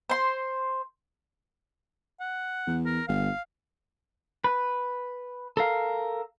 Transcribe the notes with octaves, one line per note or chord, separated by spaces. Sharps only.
C5 C6
F#5
E2
A#4
G1 F5
B4
A4 A#4 F5